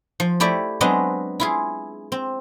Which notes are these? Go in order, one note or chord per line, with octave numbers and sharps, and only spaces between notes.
F3
A3 E4 G4 D5
F#3 G#3 B3 C4 D4 D#5
E4 F4 G#4
C4